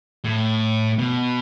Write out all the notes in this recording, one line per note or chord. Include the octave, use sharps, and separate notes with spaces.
A2
B2